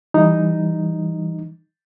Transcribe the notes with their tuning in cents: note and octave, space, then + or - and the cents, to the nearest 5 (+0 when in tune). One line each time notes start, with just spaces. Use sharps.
E3 +10 G3 +0 D#4 +0